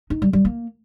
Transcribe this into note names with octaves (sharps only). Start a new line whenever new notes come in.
D#4
G3
G3
A#3